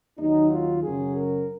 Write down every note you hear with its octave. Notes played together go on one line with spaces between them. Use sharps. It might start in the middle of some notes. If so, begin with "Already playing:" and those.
D#2 D#3 F#3 D#4
F4
F#2 C#3 F#3 G#4
A#4